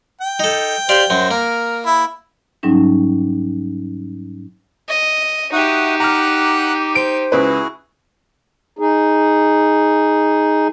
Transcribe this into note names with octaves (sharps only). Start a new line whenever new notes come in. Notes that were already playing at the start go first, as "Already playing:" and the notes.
G5
D#4 A4
G4 C5 D5 F5
F#2 F#3 C5
A#3 A#4
E4
G#2 F#3 G3 C#4 D#4
D#5
D#4 F#4 G4 E5 F#5 D#6
F#5 A#5 D6 F6 F#6
C5 G6 D7
C#2 E4 F#4 G#4 B4
D#4 G#4